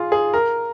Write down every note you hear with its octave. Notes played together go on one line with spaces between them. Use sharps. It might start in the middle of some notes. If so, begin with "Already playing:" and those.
Already playing: F4 G#4
G#4
A#4